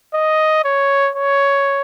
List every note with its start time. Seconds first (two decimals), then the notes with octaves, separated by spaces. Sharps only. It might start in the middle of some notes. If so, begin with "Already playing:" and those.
0.14 D#5
0.65 C#5
1.16 C#5